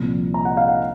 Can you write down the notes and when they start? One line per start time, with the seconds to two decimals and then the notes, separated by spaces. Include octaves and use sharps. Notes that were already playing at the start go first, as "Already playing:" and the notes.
Already playing: C2 A#2 F3
0.34 A#5
0.45 F#5
0.57 F5
0.68 F#5